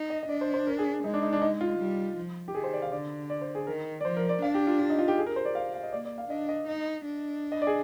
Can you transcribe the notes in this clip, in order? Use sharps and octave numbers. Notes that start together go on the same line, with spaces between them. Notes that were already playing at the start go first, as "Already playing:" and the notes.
Already playing: D#4
D#5
D#5
D4 D5
C5
C5
A#4
G#4
G#3 D#4
D4
D#4
D4
D#4
F4
G3
F3
G4
D#3 G#4
C5
D5
F5
D3 D5
D5
C5
G#4
D#3 A#4
D5
F3 C5
A#4
D5
D4 F5
G4
F4
F4
D#4
F4
G4
G#4
A#4
C5
D5
F5
F5
D#5
A#3 D5
D5
F5
D4 D#5
D#5
D#4
D4
D#5
D5
G#4